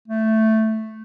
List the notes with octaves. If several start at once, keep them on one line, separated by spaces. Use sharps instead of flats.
A3